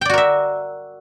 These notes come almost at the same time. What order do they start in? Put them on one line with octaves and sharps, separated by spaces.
G5 D5 F#4 A#4 E5